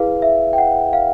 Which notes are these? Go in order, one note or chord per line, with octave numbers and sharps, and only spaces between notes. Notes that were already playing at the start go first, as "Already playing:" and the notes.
Already playing: E4 G#4 B4 F5
E5
G5
F#5
F5